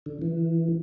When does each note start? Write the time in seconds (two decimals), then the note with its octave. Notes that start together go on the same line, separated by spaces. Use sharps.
0.06 D3
0.22 E3